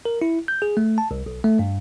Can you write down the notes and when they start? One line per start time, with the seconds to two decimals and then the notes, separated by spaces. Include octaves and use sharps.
0.05 A#4
0.22 E4
0.48 G6
0.62 G#4
0.77 A3
0.98 A5
1.11 C2
1.26 B1
1.44 A3
1.59 G2